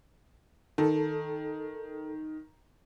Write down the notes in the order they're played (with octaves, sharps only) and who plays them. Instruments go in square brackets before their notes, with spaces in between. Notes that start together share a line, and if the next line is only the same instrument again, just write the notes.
[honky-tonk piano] D#3 [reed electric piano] A4